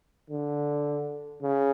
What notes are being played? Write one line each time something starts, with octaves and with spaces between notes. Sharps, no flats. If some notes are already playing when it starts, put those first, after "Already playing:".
D3
C#3